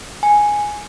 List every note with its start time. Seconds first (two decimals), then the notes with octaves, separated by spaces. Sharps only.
0.23 G#5